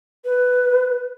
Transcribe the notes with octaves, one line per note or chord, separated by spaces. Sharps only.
B4